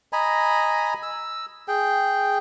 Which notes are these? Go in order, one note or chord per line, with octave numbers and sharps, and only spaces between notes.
D#5 G#5 A#5 B5
E6
G#4 G5